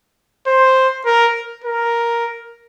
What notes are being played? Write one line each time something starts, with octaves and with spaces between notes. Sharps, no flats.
C5
A#4
A#4